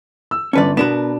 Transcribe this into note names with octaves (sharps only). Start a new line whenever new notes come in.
E6
G1 C#4 B4 D5 A5
B2 B3 D4 A#4 B4 E7